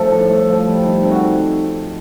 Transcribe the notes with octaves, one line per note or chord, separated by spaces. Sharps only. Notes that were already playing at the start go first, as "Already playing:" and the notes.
Already playing: F3 A3 A4
A2
A3
F3
G3
D#3
C3
F#4